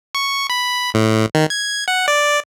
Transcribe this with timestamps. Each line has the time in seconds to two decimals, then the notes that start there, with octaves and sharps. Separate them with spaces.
0.15 C#6
0.50 B5
0.94 A2
1.35 D#3
1.50 G#6
1.88 F#5
2.08 D5